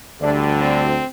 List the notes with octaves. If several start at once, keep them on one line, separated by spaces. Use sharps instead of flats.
D2 D3 G3 D4
C4